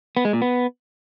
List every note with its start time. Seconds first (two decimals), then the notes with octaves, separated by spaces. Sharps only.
0.17 B3
0.25 G#3
0.33 A#2
0.42 B3